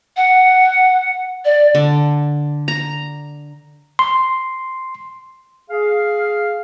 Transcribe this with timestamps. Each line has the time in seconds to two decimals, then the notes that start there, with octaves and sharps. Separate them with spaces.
0.17 F#5
1.45 D5
1.75 D3
2.68 A#5
3.99 C6
5.70 G#4 F5